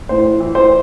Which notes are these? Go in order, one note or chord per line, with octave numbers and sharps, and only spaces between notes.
A2 C5
E3
C5